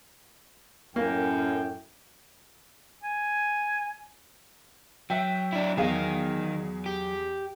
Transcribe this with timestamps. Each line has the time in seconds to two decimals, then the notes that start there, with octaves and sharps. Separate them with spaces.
0.96 F#2 A2 A#3 G5
3.03 G#5
5.10 F#3 E5 G5
5.53 D4 E4
5.77 E2 D#3 D#4 G#4 F5
6.86 G4